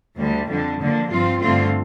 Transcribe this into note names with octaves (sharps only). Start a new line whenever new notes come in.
D2 D3 G3
F2 D3 G3
D3 F3 A#3
G2 F3 C4 F4
G2 D3 A3 C4 F4